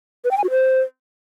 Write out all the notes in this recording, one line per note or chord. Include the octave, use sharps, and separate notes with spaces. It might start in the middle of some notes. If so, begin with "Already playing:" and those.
B4
G5
G#5
F#4
C5